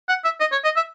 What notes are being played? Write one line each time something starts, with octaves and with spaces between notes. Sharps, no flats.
F#5
E5
D#5
C#5
D#5
E5